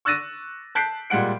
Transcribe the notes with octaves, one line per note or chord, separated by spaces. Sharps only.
C#6 E6 F#6 A6 A#6 D#7
A5 F#6 G6 B6 C7 D7
A#2 G3 G#3 F#5 D7